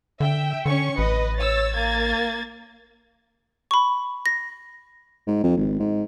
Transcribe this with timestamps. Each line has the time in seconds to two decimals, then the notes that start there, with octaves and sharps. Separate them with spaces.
0.20 D3 E5 G5
0.66 D3 C#4 C#6 C#7
0.98 A1 B4 D#5
1.39 C#5 E6 A6
1.75 A#3 G#6 A6
3.71 B5 C#6
4.26 A#6
5.27 G#2
5.43 F2
5.57 G#1
5.79 G#2